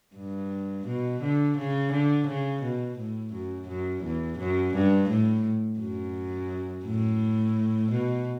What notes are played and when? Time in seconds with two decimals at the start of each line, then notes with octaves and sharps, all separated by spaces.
0.16 G2
0.86 B2
1.22 D3
1.57 C#3
1.92 D3
2.27 C#3
2.62 B2
2.98 A2
3.33 F#2
3.68 F#2
4.04 E2
4.39 F#2
4.74 G2
5.09 A2
5.79 F#2
6.85 A2
7.91 B2